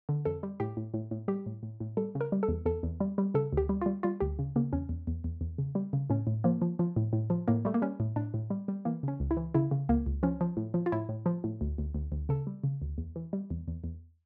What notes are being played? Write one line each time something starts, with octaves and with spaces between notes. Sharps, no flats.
D3
F2 A4
G3
A2 G4
A2
A2
A2
G3 G4
A2
A2
A2
G3 A4
C#3
A#4
G3
A4
E2
E2 A4
E2
G3
G3
C#3 A4
D2 G4
G3
F4
G3
G3 F4
D2 G4
C#3
C#3 A#3
E2 C#4
E2
E2
E2
E2
C#3
G3
C#3
A2 C#4
A2
F3 A#3
F3
F3
A2
A2
F3
A2 A#3
G3 A3
A#3
G3 C#4
A2
A2 D4
A2
G3
G3
E3 A#3
C#3 C#4
C#2
E4
E3
C#3 E4
C#3
C#2 A#3
C#2
F3 C#4
F3
A2
F3
F4
A2 E4
A2
F3
A2
D2
D2
D2
D2
C#3 A4
G3
C#3
D2
E2
E3
G3
E2
E2
E2